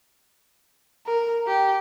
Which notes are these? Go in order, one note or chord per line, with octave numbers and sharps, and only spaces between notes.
A#4
G4